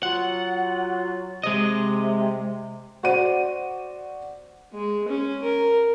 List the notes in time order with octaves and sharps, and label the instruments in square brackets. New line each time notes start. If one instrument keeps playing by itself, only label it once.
[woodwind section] F#3 F4 [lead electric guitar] F#5
[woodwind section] C3 [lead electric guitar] G#3 D#5
[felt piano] F#4 C5 D5 D#7
[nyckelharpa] G#3
C#4
A#4